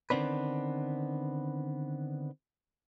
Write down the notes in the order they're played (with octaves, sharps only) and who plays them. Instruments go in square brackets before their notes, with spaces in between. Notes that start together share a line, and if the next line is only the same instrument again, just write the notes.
[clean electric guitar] D3 D#3 B3 C4 D4 B4